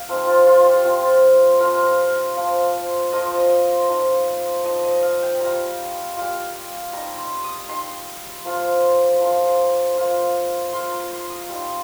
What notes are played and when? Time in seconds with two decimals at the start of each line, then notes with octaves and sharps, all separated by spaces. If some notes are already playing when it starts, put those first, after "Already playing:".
Already playing: F5
0.09 F3 C4 D#4 A#4
0.27 F4
0.47 F4
0.66 G4
0.84 F3 C4 F4
1.60 F3 C4 F4 A#4
1.71 C5
1.83 A#4
2.36 F3 A#3 F4
3.12 F3 A#3 F4 D#5
3.25 C5
3.37 D#5
3.89 F3 D#4
4.65 F3 D#4 D#5
4.83 D#5
5.02 F5
5.22 G5
5.40 G3 A#3 F4 A#5
6.17 G3 A#3 F4
6.93 G3 D#4 A#5
7.18 C6
7.44 D#6
7.69 G3 D#4 C6
8.45 F3 A#3 F4
9.20 F3 A#3 F4 C6
9.97 A#3 F4
10.73 A#3 F4 C6
10.91 A#5
11.11 C6
11.29 D#6
11.49 G3 D#4 C6